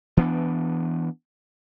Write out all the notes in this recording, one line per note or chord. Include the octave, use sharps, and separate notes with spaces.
E3 B3 D4